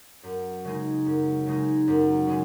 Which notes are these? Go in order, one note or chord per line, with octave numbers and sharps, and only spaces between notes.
F#2
C#3 G#3 D#4
F#2
C#3 G#3 D#4
F#2
C#3 G#3